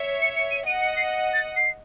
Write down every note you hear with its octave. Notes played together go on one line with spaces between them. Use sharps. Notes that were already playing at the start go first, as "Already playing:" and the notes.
Already playing: C#5 E5
C#7
C#7
D#7
D#5 F#5 D#7
C#7
C7
A6
C7